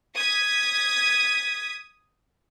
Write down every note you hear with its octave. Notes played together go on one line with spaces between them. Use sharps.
D#6 G#6 B6